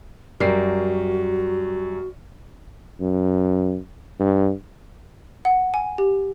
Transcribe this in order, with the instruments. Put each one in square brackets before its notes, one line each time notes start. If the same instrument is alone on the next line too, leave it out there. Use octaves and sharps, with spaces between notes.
[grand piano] F#2 A#4 C7 [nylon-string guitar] G3 [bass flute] F#4
[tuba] F#2
G2
[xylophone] F#5
G#5
G4